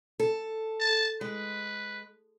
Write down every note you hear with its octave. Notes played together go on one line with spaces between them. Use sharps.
A4
A5
G#3 B4